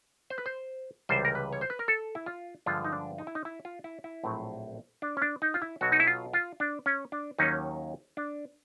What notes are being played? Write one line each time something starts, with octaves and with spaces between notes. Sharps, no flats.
C5
B4
C5
C#2 C3 E3 G3 C5
A#4
B4
C#5
C5
B4
A#4
A4
E4
F4
G2 D3 F3 G#3 F4
D#4
D4
D#4
E4
D#4
E4
F4
E4
E4
A#1 A2 F#3 A3 C4
D4
C#4
D4
D#4
F4
E4
B1 B2 F#3 F#4
D#4
E4
F4
F4
D4
C#4
D4
D#2 D#3 F#3 A#3 C#4 D#4
D4